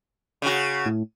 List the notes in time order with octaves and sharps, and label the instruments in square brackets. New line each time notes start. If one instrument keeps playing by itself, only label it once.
[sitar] C#3 F#4
[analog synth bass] A2